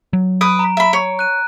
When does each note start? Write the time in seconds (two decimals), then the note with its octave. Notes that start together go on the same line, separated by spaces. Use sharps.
0.13 F#3
0.41 B4 D#6 D7
0.59 A#5
0.77 E5 B5
0.93 C#5
1.19 F#6 D#7